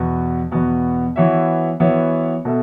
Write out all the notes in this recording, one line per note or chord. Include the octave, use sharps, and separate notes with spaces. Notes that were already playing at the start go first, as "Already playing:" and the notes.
Already playing: E2 B2 B3 F#4
E2 B2 B3 F#4
E3 B3 F#4 C#5 E5
E3 B3 F#4 C#5 E5
B2 B3 A4 E5